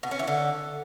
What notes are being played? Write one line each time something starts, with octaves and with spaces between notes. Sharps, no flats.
B2
C#4
E3
D3